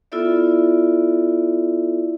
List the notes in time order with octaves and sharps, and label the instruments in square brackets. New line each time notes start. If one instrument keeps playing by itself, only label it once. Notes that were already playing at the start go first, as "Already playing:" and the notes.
[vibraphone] B3 E4 F4 A4 D5 E5